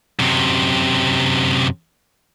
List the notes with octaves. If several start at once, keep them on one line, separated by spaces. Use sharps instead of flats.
F#2 C3